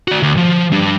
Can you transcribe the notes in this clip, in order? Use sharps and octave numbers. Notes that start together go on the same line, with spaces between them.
F#4 D5
D2
F3
G3 D4